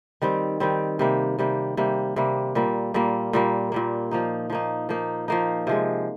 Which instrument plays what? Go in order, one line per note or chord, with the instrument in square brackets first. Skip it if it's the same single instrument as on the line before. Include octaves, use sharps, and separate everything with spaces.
[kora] D#3 G3 C4
D#3 G3 C4
C3 G3 A#3
C3 G3 A#3
C3 G3 A#3
C3 G3 A#3
A#2 G3 A#3
A#2 G3 A#3
A#2 G3 A#3
A#2 G3 A#3
F3 A#3 D#4
F3 A#3 D#4
F3 A#3 D#4
F3 A#3 D#4
C3 F3 G#3